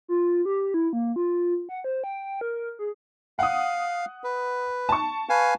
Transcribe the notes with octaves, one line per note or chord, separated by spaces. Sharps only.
F4
G4
E4
A#3
F4
F#5
C5
G5
A#4
G#4
F5 F#5 D#6
B4
A5 C#6
B4 F5 G#5